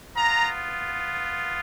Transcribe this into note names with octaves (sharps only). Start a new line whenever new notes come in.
B3 F4 A#5